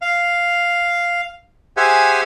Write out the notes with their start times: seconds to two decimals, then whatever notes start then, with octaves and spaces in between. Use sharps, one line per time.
0.02 F5
1.77 G4 G#4 C5 E5 F#5 G#5